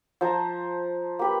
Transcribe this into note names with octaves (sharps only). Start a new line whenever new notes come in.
F3 C5 A5 A#5
A#3 G4 B4